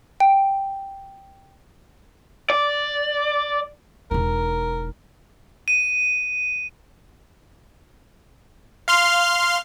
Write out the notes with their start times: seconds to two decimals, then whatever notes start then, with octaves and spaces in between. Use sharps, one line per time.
0.20 G5
2.50 D5
4.11 E1 D#4 A#4
5.68 D#7
8.88 F5 C6 F6